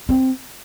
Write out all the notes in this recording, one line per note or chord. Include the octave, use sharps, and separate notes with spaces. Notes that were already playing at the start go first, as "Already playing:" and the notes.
C4